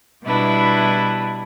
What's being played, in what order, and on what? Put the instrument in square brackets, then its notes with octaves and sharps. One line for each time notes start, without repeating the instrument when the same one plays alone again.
[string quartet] B2 G3 D4 E4 B4